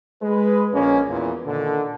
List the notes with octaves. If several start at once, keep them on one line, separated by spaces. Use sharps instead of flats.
G#3 B4
A#1 G#3 A#3 C#4
E2 A#2
A#2 D3 D#3